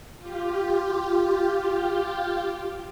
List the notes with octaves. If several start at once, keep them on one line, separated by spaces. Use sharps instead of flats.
F4 G4